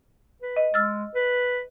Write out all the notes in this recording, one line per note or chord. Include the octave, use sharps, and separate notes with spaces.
B4
D#5
G#3 E6 F6 A6
B4